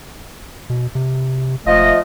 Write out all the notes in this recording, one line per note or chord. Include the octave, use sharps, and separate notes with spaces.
B2
C3
E1 F3 A3 D#5